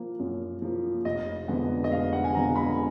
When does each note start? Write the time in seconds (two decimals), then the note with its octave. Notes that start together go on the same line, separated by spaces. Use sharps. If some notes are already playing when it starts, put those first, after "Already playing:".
Already playing: F3 A#3
0.19 F#2
0.62 F3 A#3
1.05 F1 D#5
1.48 F2 D3 G#3 B3
1.84 D#5
1.91 F1 F5
2.13 F#5
2.24 G#5
2.34 F2 D3 G#3 B3 A#5
2.56 B5